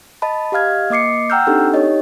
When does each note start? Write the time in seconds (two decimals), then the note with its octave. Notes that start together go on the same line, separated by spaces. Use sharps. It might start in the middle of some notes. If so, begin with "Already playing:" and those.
0.22 D#5 A5 B5
0.52 G4 D#5 F5 F6 G#6
0.90 A#3 D#5 D6 C7 C#7
1.30 F#5 G5 A#5 E6 F6 G6
1.47 C4 D4 D#4 G4 A4
1.74 D#4 G4 C#5 D#5